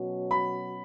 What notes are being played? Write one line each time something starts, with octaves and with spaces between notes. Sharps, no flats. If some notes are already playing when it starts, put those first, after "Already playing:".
Already playing: B2 F#3 C#4 F#4
B5